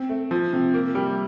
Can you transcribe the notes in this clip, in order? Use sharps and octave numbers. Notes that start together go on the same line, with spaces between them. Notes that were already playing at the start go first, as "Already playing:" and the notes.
Already playing: C4
A3
F3
C3
A#3
G3